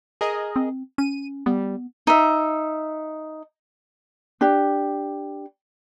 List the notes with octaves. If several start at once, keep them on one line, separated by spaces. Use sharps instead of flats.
G#4 A#4 D#5
C4
C#4 D#7
G3 B3
D#4 E5
D4 G4